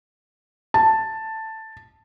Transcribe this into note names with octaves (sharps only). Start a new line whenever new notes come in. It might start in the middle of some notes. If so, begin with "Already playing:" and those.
A5